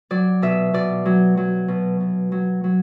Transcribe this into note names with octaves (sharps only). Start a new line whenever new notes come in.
F#3 D5
B2 E5
B2 D5
F#3
F#3
B2
B2
F#3
F#3